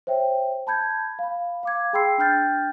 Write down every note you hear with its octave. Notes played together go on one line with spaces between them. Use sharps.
C5 C#5 E5 G5
A5 B5 G6 G#6
F5 B5
F5 D6 G#6
G#4 G5 B5 C6 E6 C7
D4 G5 F6 G6 A6